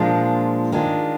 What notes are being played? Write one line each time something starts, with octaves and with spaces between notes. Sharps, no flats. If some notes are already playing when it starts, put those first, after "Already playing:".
Already playing: A#2 F3 G#3 D4 F4
D#3 G#3 D4 F4